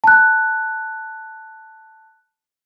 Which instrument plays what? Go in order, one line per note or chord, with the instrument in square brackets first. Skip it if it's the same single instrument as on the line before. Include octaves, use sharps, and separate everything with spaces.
[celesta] A5 F#6